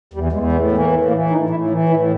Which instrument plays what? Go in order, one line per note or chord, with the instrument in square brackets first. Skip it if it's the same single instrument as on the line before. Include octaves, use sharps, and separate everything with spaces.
[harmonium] E2 G3
E2 G#3
A2
E3
A#3
A2
A#3
E3
A2 D#4
A2 E4
E3
A2 E4